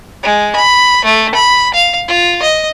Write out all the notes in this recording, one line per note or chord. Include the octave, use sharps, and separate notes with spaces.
G#3
B5
A3
B5
F5
F4
D#5